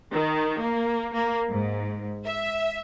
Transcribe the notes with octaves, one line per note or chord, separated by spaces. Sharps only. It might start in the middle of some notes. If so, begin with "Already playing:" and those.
D#3
A#3
A#3
G#2
E5